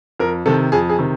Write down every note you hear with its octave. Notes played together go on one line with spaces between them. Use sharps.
F2 A#4
C3 D#3 A4
F2 G#4
G#4
C3 D#3